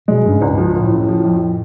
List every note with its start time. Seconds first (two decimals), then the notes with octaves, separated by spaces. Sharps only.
0.08 B2 G#3
0.24 G2 C#3
0.38 C#2 G#2
0.50 G2
0.58 F3
0.74 F#1 A2
0.92 C#3
1.09 F3
1.24 F2